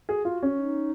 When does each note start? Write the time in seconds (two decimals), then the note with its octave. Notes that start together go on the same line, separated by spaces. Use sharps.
0.09 F#4 G#4
0.25 F4
0.43 C#4
0.59 D#4